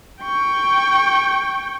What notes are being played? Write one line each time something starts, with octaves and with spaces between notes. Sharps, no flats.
G5 C#6